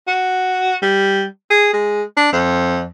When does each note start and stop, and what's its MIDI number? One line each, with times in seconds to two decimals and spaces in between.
0.07 0.76 66
0.82 1.24 55
1.50 1.70 68
1.73 2.03 56
2.17 2.28 62
2.33 2.87 41